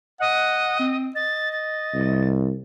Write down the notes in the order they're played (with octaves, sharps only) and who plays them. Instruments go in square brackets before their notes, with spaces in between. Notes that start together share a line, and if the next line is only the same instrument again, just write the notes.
[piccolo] D#5 [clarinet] F#5
[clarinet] C4
[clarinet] D#5 [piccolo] A6
[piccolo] A6
[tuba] C2